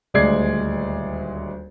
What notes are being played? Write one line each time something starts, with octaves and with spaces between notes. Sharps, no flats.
D#1 D2 G#3 D5 G#6 C7